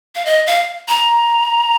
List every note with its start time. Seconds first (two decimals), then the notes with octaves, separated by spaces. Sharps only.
0.15 F5
0.25 D#5
0.47 F5
0.89 A#5